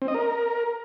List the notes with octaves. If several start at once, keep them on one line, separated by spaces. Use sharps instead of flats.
C4
D#5
A#4